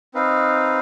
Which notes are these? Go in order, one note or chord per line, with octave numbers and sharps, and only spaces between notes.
C4 D#4 B4 F5